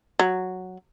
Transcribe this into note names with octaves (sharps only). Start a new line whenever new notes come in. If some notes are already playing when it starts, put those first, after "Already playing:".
F#3